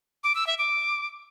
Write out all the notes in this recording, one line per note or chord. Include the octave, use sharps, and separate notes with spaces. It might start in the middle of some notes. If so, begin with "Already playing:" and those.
D6
E6
E5
D6